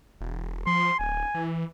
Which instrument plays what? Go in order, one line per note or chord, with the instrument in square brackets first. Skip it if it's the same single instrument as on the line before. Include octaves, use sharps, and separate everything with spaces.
[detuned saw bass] E1
[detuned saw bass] F3 [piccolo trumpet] C6
[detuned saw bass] D1 [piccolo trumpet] G#5
[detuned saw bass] E3